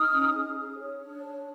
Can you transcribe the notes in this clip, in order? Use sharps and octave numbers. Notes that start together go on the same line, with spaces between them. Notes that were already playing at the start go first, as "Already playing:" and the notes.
Already playing: D#4 D#6 F6
C#4
G#4
G#4
C#5
D4
C#5